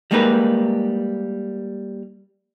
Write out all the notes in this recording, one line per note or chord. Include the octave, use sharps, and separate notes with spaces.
G3 G#3 A#3 D#4 A#4 B4